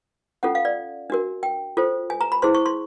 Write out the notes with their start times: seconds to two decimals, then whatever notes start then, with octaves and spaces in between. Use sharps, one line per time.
0.43 C#4 F4 A4 F#5
0.55 F5
0.65 D5
1.10 D4 F#4 A#4
1.43 G5
1.77 F4 A4 C5
2.10 G#5
2.21 A#5
2.32 B5
2.42 E4 G#4 C5 C6
2.55 C#6
2.66 C6